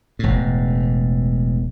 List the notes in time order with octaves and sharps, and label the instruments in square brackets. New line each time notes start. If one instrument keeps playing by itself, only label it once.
[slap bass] E1 A2